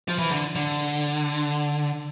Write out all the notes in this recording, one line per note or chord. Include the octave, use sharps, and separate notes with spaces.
F3
E3
D3
D3